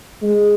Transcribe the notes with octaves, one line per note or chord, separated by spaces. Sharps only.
G#3